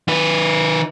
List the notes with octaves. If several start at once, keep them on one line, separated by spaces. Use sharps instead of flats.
D#3 B4